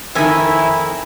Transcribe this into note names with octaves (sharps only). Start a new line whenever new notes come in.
F2 D#3 E4 E5 G#5